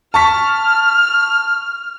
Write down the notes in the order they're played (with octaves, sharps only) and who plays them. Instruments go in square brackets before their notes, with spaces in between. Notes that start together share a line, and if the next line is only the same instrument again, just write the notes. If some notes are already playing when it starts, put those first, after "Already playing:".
[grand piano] A5 C#6 B6 [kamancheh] F6